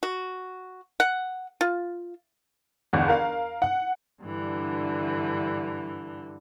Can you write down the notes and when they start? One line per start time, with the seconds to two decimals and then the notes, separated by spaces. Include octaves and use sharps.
0.03 F#4
1.00 F#5
1.61 F4
2.93 G1 E2
3.08 A#4 F5
3.62 F#5
4.22 G2 D3 E3